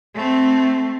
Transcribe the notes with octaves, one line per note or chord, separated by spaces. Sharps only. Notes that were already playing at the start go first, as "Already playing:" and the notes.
A3 C4